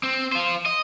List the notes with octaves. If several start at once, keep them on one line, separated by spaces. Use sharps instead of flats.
C4
F4 C5
D#5